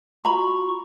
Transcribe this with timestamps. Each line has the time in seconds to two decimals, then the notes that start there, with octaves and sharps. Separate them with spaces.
0.25 F4 F#4 A#5 B5 C#6